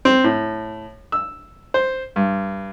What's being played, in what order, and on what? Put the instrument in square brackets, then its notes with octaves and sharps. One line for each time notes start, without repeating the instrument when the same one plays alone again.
[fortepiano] C4
A2
E6
C5
G2